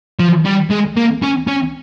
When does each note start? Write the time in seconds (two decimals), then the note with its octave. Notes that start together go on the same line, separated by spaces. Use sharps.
0.19 F3
0.45 G3
0.70 G#3
0.96 A#3
1.22 C#4
1.47 C#4